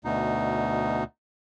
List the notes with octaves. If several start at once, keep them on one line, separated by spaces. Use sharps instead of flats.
D2 B2 D#4